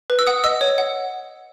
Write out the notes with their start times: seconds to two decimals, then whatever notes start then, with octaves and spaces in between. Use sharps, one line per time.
0.10 B4
0.19 E6
0.27 F#5 D#6
0.44 D#5 E6
0.61 C#5
0.78 F#5